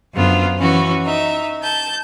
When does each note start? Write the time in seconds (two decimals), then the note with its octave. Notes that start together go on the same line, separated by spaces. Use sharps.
0.14 F#2 D3 B3 F4 C5
0.59 E3 C#4 F#4
1.05 D#4 E5
1.63 A5 G6